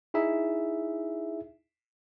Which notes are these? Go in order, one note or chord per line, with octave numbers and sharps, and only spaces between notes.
D#4 E4 G#4 E5